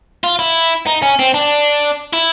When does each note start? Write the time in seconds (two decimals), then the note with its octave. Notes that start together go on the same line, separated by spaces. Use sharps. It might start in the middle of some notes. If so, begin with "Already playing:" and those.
0.24 F4
0.39 E4
0.87 D#4
1.02 C#4
1.19 C4
1.34 D4
2.13 E4